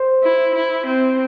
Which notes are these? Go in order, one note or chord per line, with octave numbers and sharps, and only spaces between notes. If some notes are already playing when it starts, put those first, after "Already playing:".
Already playing: C5
E4
E4
C4